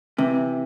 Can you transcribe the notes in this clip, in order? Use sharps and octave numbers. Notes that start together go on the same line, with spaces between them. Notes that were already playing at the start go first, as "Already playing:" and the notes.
C3 E3